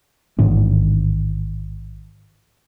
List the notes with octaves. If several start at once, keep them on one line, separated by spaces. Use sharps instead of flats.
A1 G#2 D#3 D4